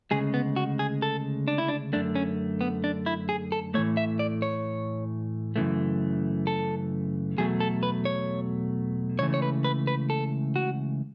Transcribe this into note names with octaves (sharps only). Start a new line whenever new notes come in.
D2 C#3 G#3 G#4
B3
F#4
G#4
A4
D4
E4
D4
F#2 D3 A3 D4
C#4
B3
D4
E4
G#4
A4
A2 E3 A3 C#5
E5
D5
C#5
F#2 C#3 E3 A3
A4
E2 B2 F#3 A3 G#4
A4
B4
C#5
C#2 C#3 E3 A3 C#5
C#5
B4
B4
B4
A4
F#4